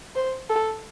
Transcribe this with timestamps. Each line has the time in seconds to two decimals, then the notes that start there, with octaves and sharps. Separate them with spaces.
0.15 C5
0.49 A4